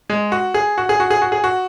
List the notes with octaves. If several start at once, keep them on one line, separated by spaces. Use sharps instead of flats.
G#3
F#4
G#4
F#4
G#4
F#4
G#4
F#4
G#4
F#4